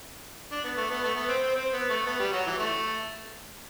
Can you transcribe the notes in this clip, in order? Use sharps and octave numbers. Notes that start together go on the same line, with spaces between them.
D4
B3
A3
B3
A3
B3
C4
C4
C4
B3
A3
B3
G3
F#3
E3
A3